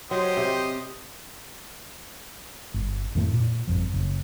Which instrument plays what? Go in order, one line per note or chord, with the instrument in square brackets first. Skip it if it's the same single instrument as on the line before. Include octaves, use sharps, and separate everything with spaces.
[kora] F#3 [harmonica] G4 C5 D#5
[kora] C3
[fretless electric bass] G1
F2 A2 D#3 A3
A#2
G1 F2 F3
F#1 C#3